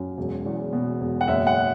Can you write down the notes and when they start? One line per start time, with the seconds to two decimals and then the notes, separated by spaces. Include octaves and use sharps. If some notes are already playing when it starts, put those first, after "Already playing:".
Already playing: F#2
0.17 E1
0.46 E2
0.73 B2
1.01 E1
1.21 F#5
1.28 F#1 E5
1.47 F#5